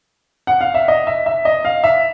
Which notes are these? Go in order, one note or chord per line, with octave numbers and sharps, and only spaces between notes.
F#5
F5
E5
D#5
E5
E5
D#5
F5
E5